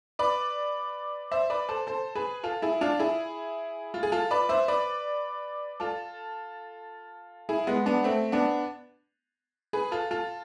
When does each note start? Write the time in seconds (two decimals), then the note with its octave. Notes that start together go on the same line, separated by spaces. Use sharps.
0.19 B4 D5
1.31 C5 E5
1.50 B4 D5
1.69 A4 C5
1.87 A4 C5
2.15 G#4 B4
2.43 F4 A4
2.62 E4 G#4
2.81 D4 F4
2.99 E4 G#4
3.94 F4
4.03 G#4
4.12 F4 A4
4.31 B4 D5
4.49 C5 E5
4.68 B4 D5
5.80 F4 A4
7.49 E4 G#4
7.67 G#3 B3
7.86 B3 D4
8.04 A3 C4
8.32 B3 D4
9.73 G#4 B4
9.92 F4 A4
10.11 F4 A4